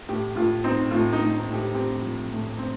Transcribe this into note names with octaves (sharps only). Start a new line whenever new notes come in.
A2 G4
A2 F4
C4 D#4
A2 F4
D#4
A2
D#4
A2
G4
C4 G4
F3
A2
C4